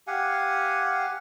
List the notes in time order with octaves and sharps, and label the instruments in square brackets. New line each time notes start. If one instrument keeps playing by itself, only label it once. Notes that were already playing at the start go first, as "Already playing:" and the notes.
[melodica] G4 F5 F#5 G#5